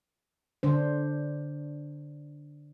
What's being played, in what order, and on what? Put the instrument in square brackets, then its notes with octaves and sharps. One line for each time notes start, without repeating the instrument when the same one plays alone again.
[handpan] D3 D4 C5